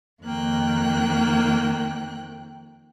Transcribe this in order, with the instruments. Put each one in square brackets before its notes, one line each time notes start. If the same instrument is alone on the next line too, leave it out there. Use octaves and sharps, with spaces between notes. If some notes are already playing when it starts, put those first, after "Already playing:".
[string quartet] F2 D#3 A#3 G5 F#6